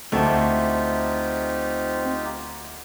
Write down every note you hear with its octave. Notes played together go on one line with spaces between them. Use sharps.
D2 A3 C4 D#4 F4 G4 E5